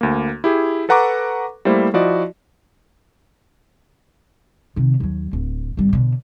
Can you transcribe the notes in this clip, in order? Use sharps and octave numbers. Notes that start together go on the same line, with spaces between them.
D2 A#3
E4 G4 G#4
A4 B4 F#5 A#5 C#6 D6
G3 A3 A#3 E4 C5
F3 E4 F#4 D5 D#5
C3 D#3
D#2 F#3
D1
G#1 G3
B2 D3